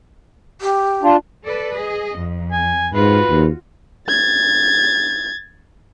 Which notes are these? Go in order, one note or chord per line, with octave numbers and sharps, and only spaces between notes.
G4
D4 F4
A4 B4 D5
G#4 D#5
F2
G#5
G#2 F4 F#4 B4
D#2
G#6 A6